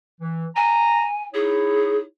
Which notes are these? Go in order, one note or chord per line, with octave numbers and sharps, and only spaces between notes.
E3
G#5 A#5
D#4 E4 G#4 C#5